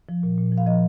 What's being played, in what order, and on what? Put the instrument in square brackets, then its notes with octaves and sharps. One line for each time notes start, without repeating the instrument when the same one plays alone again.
[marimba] F3
A#2
A#2
F3
F5
F3 D#5